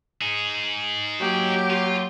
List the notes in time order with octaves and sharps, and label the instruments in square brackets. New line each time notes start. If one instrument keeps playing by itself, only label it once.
[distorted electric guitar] D#4 G#4
[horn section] F#3 A#3 [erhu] G4
[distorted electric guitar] F4 C6